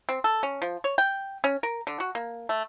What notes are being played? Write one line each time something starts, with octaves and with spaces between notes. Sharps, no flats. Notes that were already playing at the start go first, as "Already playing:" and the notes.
C4
A4
C#4
F3
C#5
G5
C#4
A#4
D3
F#4
A#3
A3